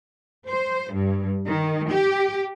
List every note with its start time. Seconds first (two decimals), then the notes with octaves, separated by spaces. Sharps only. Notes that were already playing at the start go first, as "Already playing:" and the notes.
0.48 C5
0.93 G2
1.47 D#3
1.90 G4